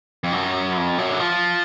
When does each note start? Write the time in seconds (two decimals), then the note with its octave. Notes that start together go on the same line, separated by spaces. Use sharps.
0.24 F2
0.33 F#2
0.77 F2
0.98 F#2
1.09 D3
1.20 F3